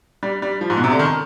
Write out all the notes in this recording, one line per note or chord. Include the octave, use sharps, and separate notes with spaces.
G3
G3
F3
G#2
B2
C3
D3
D#3